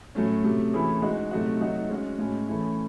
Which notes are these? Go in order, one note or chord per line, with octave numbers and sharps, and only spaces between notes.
A2 F#3 A3 C#4
C3 F#3 A3
E3 A3 C#4 E4 G#4
G#3 D#4 F#4
C3 F#3 A3 D#4 F#4
F#3 A3 D#4 F#4
G#3 C#4 F#4
A2 G#3 C#4
E3 A3 C#4 E4